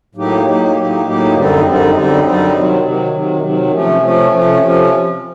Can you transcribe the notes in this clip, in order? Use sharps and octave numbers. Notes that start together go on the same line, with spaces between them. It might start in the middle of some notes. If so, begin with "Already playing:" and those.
A2 F#3 A#3 D#4 G4
A2 F#3 A#3 D#4 G4
A2 F#3 A#3 D#4 G4
A2 F#3 A#3 D#4 G4
F#2 D3 G3 C4 D#4
F#2 D3 G3 C4 D#4
F#2 D3 G3 C4 D#4
F#2 D3 G3 C4 D#4
C3 D#3 F#3
C3 D#3 F#3
C3 D#3 F#3
C3 D#3 F#3
C3 F3 A3 C#4
C3 F3 A3 C#4
C3 F3 A3 C#4
C3 F3 A3 C#4